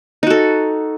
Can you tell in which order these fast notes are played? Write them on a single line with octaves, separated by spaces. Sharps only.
D#4 F#4 A4